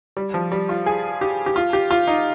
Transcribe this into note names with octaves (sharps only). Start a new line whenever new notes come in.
G3
F3
G3
F4
G#4
G4
G4
F4
G4
F4
D#4